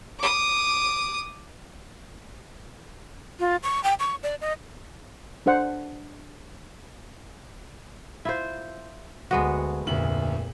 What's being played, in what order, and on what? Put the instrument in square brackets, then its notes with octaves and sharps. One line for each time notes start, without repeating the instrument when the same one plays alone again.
[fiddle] D6 D#6
[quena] F4
C#6
G5
C#6
D5
D#5
[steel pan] D4 A4 C5 F#5
[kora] E4 F4 C5
[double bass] D2 [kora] G#3 B3 F#4
[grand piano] F1 D2 F#7 [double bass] A#2